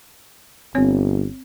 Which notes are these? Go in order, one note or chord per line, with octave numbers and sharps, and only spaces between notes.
G1 C4 C#5